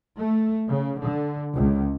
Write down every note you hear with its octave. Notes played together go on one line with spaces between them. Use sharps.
A3
C#3
D3
C#2